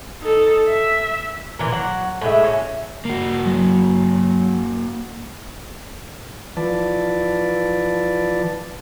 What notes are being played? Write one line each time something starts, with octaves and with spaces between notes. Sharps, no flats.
D#4 A4
E5
A#2 E3 A#4
F#3 F#5
A2 G#3 E5
C#4 F#4
A#3 F#4
F#3
E3 F3 B4 D5 A5